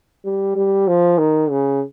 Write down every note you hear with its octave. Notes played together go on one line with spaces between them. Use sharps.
G3
G3
F3
D#3
C#3